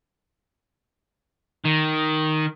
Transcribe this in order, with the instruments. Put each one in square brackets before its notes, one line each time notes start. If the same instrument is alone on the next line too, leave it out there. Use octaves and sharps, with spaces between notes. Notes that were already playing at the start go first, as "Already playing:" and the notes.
[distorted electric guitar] D#3